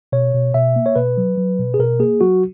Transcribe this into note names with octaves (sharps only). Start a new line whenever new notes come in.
B2 C#5
B2
B2 E5
A#3
C#5
B2 B4
F#3
F#3
B2
G#4
B2 A#4
A#3 G#4
F#3 F#4